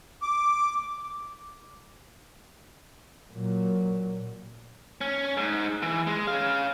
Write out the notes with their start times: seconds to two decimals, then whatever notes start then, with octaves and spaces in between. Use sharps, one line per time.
0.22 D6
3.33 A#2 F#3
5.01 C#4
5.37 G#2
5.82 E3
6.07 G#3
6.27 C#4 F5